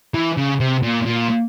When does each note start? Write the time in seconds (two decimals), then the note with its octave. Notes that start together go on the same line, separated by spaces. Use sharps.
0.14 E3
0.37 C#3
0.60 C3
0.83 A#2
1.06 A#2